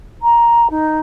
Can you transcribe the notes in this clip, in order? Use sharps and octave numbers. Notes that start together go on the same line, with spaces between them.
A#5
D#4